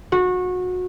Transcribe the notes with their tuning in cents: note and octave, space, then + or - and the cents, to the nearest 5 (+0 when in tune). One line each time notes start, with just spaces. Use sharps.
F#4 -25